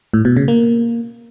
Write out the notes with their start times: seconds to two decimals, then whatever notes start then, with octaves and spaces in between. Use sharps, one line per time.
0.14 A2
0.25 B2
0.37 C#3
0.48 A#3